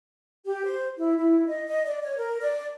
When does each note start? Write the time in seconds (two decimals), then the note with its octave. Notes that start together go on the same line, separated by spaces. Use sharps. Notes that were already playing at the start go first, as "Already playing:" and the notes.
0.46 G4
0.65 C5
0.98 E4
1.17 E4
1.48 D#5
1.67 D#5
1.86 D5
2.03 C#5
2.18 A#4
2.41 D5